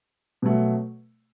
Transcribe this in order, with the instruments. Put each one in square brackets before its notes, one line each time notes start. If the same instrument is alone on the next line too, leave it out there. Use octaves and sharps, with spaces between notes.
[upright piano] B2 F#3 A3